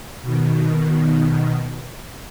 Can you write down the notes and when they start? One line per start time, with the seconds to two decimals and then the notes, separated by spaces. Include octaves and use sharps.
0.22 B2 D#3